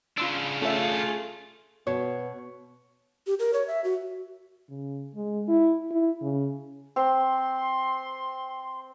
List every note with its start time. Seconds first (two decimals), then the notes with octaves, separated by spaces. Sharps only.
0.18 C#3 D4 F4 C6 E6
0.62 A3 C#4 F4 G#4 E5
1.87 B2 B3 C#5
3.27 G4
3.39 A#4
3.53 C#5
3.67 E5
3.84 F#4
4.69 C#3
5.15 G#3
5.48 E4
5.91 E4
6.22 C#3
6.96 C4 C6